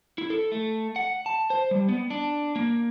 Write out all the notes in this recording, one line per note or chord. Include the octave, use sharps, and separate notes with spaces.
E4
A4
A3
F#5
A5
C5
G3
B3
D4
A#3